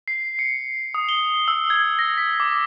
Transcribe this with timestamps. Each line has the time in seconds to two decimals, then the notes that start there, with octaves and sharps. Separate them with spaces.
0.08 C7
0.39 C#7
0.94 D#6
1.09 G7
1.48 E6
1.70 G#6
1.99 A#6
2.17 B6
2.40 D6